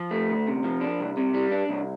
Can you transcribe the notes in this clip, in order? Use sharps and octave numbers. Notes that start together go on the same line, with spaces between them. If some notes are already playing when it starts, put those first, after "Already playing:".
Already playing: F3
A3
D2
C3
F3
D4
C2
C3
G3
D4
C2